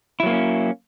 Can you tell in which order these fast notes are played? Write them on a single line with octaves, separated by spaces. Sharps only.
E4 F#3 A#3 C4 C#4